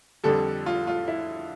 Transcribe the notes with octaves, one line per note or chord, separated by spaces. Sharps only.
F2 D3 G3 A4
F4
F4
E4